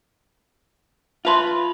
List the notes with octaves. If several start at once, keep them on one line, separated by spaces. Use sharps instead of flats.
F4 B4 E5 A5 C6